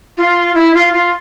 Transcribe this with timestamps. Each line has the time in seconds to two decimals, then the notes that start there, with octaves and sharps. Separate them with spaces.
0.17 F4
0.54 E4
0.74 F4
0.93 F4